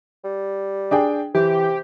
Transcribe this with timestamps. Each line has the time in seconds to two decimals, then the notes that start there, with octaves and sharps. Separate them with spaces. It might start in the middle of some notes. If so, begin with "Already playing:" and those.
0.24 G3
0.91 D4 G#4 G5
1.35 C3 E3 G4